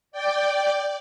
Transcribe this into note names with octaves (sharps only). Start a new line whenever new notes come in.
D5 G5